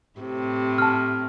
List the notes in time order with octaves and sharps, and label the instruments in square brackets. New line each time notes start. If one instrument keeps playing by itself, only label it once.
[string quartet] A2 C3
[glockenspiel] A5 F6